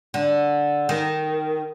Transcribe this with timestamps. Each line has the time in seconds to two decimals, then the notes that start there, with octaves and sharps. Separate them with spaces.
0.14 D3
0.89 D#3